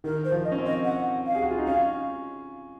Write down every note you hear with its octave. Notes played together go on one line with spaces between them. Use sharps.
D#3 A#4
C5
F3
D#5
C#4
C4
D#5
F#5
F5
G#4
F#4
F4
D#4
C#4 F5